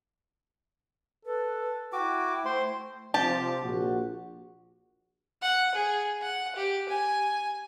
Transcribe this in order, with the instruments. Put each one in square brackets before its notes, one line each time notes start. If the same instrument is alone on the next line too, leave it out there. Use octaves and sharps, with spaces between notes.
[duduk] A4 [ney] B4
[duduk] E4 [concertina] F#4 D6 [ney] G5
[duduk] A3 [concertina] C5 C6
[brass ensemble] C3 F3 [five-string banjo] G4 A5
[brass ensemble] A#1 F#4
[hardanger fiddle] F#5
G#4
F#5
G4
G#5